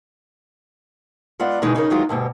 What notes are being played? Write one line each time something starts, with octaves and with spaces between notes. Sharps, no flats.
G#3 B3 F4 D5 F#5
B2 D#3 E3 G#3 D#4
C#3 D#4 E4 A#4 C#5
D#3 E3 F#3 G#3 F4
D2 G2 B2 G4